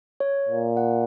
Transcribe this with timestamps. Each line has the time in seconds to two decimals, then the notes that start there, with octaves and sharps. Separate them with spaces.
0.20 C#5
0.49 A#2
0.77 F#5